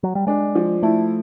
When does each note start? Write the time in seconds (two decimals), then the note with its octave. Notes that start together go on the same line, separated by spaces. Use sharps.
0.03 F#3
0.15 G3
0.27 G#3 D4
0.55 F3
0.82 A3 E4